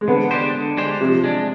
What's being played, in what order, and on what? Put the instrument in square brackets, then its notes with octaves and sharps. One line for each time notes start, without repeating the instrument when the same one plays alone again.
[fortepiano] G#3
[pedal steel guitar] D3 [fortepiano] B3
[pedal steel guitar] G#3 D4 G4 C5
D3
G#3 D4 G4 C5
[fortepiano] C3 [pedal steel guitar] F3
[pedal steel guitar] G#3 D4